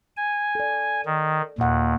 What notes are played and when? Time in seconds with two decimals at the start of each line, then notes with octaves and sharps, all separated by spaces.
0.17 G#5
0.55 A4 D5
1.06 D#3
1.58 D#2 A#2 F#5